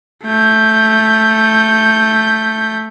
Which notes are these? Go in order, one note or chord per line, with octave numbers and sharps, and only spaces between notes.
A3 G6